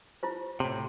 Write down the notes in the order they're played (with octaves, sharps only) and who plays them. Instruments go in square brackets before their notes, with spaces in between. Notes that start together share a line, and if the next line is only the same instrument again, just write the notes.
[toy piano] E4 F4 C5
[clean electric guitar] A2 C3